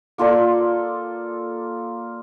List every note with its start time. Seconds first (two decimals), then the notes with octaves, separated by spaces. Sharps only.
0.18 A#3 F4 A4 D5